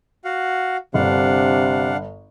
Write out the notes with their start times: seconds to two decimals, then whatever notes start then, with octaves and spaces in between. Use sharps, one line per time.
0.25 F#4 F5 F#5
0.94 G1 C3 D4 F5 F#5